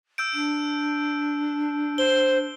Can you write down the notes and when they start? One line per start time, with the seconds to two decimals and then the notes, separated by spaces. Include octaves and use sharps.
0.18 E6 G6 D7
0.33 D4
1.98 C5 G7